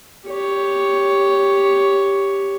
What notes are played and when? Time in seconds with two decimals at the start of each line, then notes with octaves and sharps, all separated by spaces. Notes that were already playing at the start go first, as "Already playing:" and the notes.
0.28 G4 C#5